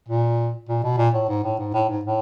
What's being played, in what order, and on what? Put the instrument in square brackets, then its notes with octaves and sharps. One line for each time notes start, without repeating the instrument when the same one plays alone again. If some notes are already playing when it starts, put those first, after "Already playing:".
[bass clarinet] A#2
A#2
B2
A#2
A2
G#2
A2
G#2
A2
G#2
A2